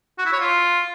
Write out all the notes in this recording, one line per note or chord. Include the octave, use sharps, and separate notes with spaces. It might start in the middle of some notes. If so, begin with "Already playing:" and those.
F#4
E4
C#5
F4